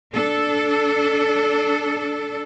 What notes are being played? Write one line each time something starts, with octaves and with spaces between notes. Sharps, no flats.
D4 A4